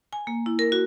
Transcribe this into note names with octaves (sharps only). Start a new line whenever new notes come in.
G#5
A#3
E4
A#4
F#4